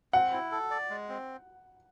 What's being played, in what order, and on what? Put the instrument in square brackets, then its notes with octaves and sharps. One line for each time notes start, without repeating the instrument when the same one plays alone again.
[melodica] C4 [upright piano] F#5
[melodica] E4
A4
D5
G#3
C4